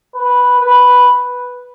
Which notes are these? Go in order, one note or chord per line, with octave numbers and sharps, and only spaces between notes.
B4
B4